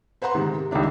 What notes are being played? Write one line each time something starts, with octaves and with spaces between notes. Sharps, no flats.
B4 C5 F#5 A#5 C6
G#2 C3 D#3
C3
C#2 D#3 G3 D4 E4